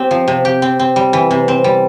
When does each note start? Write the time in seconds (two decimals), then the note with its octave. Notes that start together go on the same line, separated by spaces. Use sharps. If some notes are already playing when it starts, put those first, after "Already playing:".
Already playing: C4 G4
0.11 F3
0.28 C3
0.45 G4
0.62 C4
0.79 C4
0.96 G3
1.13 E3
1.31 C3
1.48 C4
1.64 G3